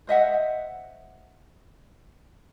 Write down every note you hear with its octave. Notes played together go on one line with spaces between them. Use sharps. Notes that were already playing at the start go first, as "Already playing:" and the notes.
C5 D#5 E5 F#5